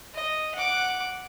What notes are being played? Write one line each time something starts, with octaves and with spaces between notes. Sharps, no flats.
D#5
F#5 D6